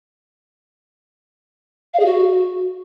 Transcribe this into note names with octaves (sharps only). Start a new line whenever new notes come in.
F5
G#4
F#4